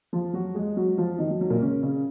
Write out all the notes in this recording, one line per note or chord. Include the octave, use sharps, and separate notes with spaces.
F3 F4
F#3 F#4
G#3 G#4
F#3 F#4
F3 F4
D#3 D#4
F#3
F#3
A#2 A#3
C#3 C#4
C#3 C#4